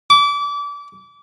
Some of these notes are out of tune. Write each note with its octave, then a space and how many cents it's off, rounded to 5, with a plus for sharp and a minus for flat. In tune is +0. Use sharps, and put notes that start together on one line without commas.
D6 -30